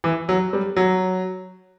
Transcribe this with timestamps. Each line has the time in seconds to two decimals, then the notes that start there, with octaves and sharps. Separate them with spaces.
0.04 E3
0.29 F#3
0.53 G3
0.76 F#3